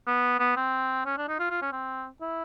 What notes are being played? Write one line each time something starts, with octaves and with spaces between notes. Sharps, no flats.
B3
B3
C4
C#4
D4
D#4
F4
F4
C#4
C4
E4